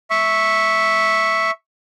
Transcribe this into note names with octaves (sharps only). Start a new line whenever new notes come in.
E5 C#6